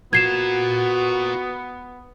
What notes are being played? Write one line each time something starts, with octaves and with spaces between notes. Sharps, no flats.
B3 F4 F#4 A#4 G#6 C7 E7